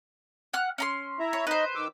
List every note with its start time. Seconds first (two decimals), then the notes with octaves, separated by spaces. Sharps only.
0.54 F#5 F6 F#6
0.78 C#4 A#5 C6
1.20 E4 E5 A#5
1.33 C#5
1.47 D#4 B4 C5 D#5
1.75 D#3 D6 E6